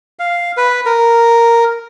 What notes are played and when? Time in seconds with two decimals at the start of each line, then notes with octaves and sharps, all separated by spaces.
0.19 F5
0.57 B4
0.86 A#4